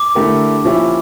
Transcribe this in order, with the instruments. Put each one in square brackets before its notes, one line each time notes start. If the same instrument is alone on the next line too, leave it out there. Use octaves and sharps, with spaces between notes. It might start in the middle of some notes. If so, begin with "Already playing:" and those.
Already playing: [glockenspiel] D6
[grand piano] D3 A3 E4 G4 A#4
A#2 F3 C#4 E4 G4